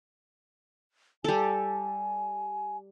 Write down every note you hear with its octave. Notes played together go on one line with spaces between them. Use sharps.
G3 A4 G#5